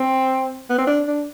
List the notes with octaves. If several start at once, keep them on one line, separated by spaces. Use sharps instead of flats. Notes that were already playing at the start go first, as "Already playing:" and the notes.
Already playing: C4
B3
C4
D4
D4